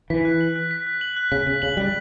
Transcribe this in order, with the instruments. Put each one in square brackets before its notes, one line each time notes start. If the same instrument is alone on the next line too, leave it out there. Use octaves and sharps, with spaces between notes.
[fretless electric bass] E3 [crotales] B6
[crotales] F#6
F#7
F#6
B6
F#6
F#7
F#6
[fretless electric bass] C#3 [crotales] B6
[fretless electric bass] C#3 [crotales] F#6
[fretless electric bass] C#3 [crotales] F#7
[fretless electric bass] G3 [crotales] F#6